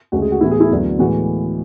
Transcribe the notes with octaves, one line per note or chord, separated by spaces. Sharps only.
D2 C#3 G#3 F#4
G#4
F#4
A2 E3 B3 E4
G#4
E4
D2 D3 F#3 B3
A2 E3 G#3 B3 F#4